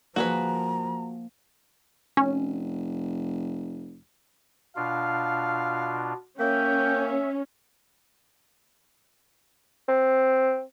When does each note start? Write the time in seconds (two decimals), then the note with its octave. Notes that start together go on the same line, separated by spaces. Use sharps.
0.16 F3 A#3 F#4 G#4 B4 A#5
2.17 F1 C#4
4.76 B2 D4 F4 F5
6.39 A#3 C#4 E5 G5
9.88 C4